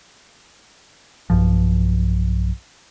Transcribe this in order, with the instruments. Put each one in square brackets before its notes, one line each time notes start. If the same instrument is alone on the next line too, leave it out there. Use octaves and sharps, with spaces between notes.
[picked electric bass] B1 G2 F3